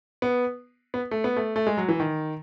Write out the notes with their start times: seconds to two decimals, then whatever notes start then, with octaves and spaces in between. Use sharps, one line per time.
0.22 B3
0.94 B3
1.11 A3
1.24 B3
1.36 A3
1.56 A3
1.67 G#3
1.77 F#3
1.89 E3
2.00 D#3